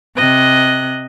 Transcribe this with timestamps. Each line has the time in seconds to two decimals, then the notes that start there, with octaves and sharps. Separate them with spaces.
0.16 C3 D#5 F#6